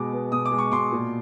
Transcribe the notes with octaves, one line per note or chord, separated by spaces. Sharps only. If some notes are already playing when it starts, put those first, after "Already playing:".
Already playing: B2 G#3 D6
B3
B2 D#6
D6
G#3
C#6
B2 C6 D6
A#2